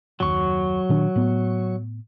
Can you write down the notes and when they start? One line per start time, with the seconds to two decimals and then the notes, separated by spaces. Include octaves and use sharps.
0.20 F#1 D#2 F#3 C#6
0.89 A#2 D#3 D4
1.16 A2 B3